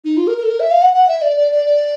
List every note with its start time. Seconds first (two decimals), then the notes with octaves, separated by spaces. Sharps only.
0.05 D#4
0.17 F4
0.27 A#4
0.38 A#4
0.43 A4
0.49 A#4
0.60 E5
0.71 F5
0.82 F#5
0.93 F#5
1.08 E5
1.22 D5
1.37 D5
1.52 D5
1.66 D5